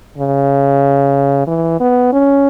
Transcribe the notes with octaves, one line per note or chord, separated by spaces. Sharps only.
C#3
E3
B3
C#4